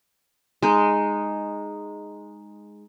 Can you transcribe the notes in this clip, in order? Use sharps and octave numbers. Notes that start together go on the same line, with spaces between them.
G#3 D#4